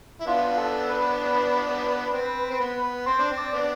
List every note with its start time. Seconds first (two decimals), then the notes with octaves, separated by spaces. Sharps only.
0.20 E4
0.27 B3 D4 F4
0.58 A4
0.89 B4
2.13 C4
2.51 C4
2.60 B3
3.06 C4 C5
3.19 D4
3.32 C4
3.37 D5
3.53 B3 D4